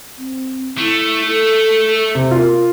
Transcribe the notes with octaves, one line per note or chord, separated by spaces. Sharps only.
C4
A3 E4
A4
C3
F4 A#4